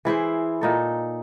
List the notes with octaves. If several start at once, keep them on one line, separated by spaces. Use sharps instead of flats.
E3 E4 G#4 C5
A#2 D#4 A4